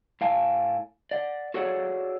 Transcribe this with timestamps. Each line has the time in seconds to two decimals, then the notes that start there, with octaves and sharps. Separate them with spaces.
0.21 A2 F5 G#5 A5
1.11 D5 F#5
1.54 F#4 G#4 A4 C#5 D5 F#5